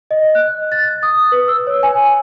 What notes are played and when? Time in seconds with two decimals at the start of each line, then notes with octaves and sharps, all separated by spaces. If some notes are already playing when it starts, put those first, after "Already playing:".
0.11 D#5
0.35 F#6
0.72 A6
1.03 D#6
1.32 B4
1.48 E6
1.67 C#5
1.83 G#5